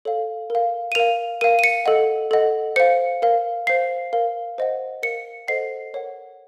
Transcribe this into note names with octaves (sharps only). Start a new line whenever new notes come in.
A4 C#5 F5
A#4 F5
D#7
A#4 F5 F7
A#4 F5 D#7
D#7
C#7
A4 D#5 F#5
A4 D#5 F#5
C5 F5 C#7
A#4 F5
C5 F5 C7
A#4 F5
C5 D#5 F#5
A#4 F5 C#7
A4 C5 D#5 F#5 C7
A#4 C#5 F#5